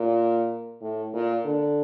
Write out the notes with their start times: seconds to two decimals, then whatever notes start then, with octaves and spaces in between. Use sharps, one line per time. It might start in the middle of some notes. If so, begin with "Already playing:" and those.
Already playing: A#2
0.81 A2
1.13 A#2
1.45 D3